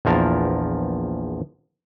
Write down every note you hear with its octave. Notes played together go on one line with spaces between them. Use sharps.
A#1 E2 F3 A#4 A5